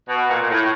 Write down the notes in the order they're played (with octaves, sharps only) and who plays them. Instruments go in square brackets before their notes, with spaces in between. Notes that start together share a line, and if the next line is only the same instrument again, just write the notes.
[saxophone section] B2
A#2
A#2
A2